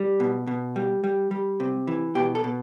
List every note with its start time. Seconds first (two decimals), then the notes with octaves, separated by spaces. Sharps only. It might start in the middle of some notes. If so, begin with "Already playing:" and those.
Already playing: G3
0.20 B2
0.47 B2
0.76 G3
1.04 G3
1.31 G3
1.60 C3
1.87 E3
2.15 B2 G4
2.35 A4
2.44 B2